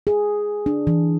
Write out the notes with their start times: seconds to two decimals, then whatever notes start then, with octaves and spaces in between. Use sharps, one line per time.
0.07 G#4
0.66 D4
0.87 E3